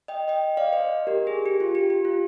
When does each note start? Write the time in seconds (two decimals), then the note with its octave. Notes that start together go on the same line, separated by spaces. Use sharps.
0.08 D#5 G5
0.28 D#5 G5
0.57 D5 F5
0.72 C5 D#5
1.07 G4 A#4
1.27 G#4
1.46 G4
1.60 F4
1.75 G4
1.90 G4
2.05 F4